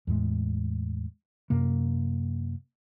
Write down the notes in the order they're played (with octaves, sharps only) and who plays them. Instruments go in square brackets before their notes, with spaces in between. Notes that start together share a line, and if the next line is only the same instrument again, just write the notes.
[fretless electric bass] E2 A2 G#3
F#2 C3 A#3